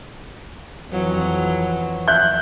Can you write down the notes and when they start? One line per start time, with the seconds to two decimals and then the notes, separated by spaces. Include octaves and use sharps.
0.89 F2 E3 F#3
2.08 E5 F#6 G6